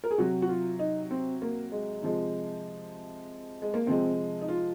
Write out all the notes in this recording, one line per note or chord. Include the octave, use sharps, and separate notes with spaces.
A#4
G#4
C3 F#3 F#4
F#4
F4
D#4
C4
A#3
G#3
C3 F3 G#3
G#3
A#3
C3 F3 G#3 C4
D#4
F4